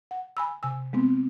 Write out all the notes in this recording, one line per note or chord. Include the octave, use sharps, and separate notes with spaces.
F#5
G#5 B5 E6
C3 G#5 E6
G#3 B3 C4